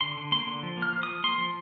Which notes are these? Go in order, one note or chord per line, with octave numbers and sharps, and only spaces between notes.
D3 C6
D3
A#3 C6
D3
F3
A#3
F6
F3
F3 D#6
A#3 C6
F3